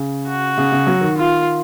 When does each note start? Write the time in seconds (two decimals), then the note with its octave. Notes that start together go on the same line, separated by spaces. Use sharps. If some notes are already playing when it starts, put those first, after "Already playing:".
Already playing: C#3
0.28 F#4
0.58 C#3
0.72 C#3
0.87 F#3
1.01 D#3
1.17 F4